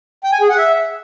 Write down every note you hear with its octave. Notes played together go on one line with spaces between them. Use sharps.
G5
G#5
G#4
F#5
E5